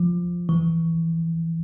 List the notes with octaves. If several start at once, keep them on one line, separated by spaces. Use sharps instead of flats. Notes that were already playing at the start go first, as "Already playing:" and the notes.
Already playing: F3
E3